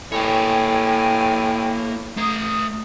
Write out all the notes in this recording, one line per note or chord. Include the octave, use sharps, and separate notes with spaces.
A2 A#3 C#5 G5 G#5
A3 A#5 D#6